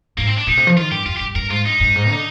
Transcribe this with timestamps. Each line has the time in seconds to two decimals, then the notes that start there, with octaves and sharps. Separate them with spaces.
0.18 G#2 A#3
0.27 C4
0.38 D4
0.47 A#2 D#4
0.57 C3
0.67 F3
0.76 D#3 F4
0.91 G2 G4
1.06 F2 F4
1.17 G4
1.21 G2
1.35 G2 A#4
1.50 G#2 F4
1.66 G2 D#4
1.81 G2
1.96 G#2
2.09 D3